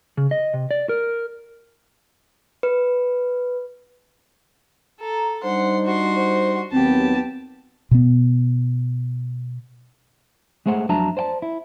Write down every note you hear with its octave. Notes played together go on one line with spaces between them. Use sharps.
C#3
D#5
C3
D5
A#4
B4
A4 A#5
G3 D4 D#4 C5 F#5 C6
F#4 C6
C5
D#2 F#3 B3 C4 G4 A5
B2 B3
G#3 A3 G#4 C5 F#5
F2 F#3 D4 E5 A5 A#5
C5 D5 G5 A5
E4